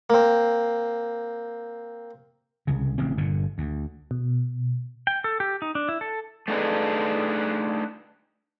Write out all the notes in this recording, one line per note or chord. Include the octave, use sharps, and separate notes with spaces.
A#3 C4
C2 C#3
A1 C#3 C4
G1 G2 A#2 D3
D2
B2
G5
A4
G4
D#4
D4
E4
A4
A3 D4 D#4 G#4 B4